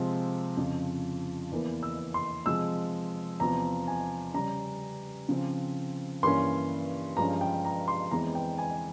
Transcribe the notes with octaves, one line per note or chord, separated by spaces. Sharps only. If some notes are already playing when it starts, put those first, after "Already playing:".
Already playing: C3 F3 G#3 C4
F2 C#3 F3
E2 E3 A#3
E6
C6
C3 F3 G#3 E6
E2 C3 F3 A#5
G#5
C#3 G3 C#4 A#5
C#3 F3 C4
G2 E3 A#3 C#4 C6
G2 F3 G#3 C#4 A#5
G5
A#5
C6
E2 E3 G#3 C4 A#5
G5
G#5